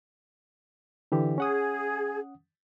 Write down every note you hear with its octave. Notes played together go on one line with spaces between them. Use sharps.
D3 E3 G4
C#4 G#4 F#5 D#6